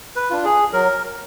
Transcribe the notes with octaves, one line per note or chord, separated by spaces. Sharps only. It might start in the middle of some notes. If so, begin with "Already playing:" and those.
B4
D4 F4
G#4
F#3 A#4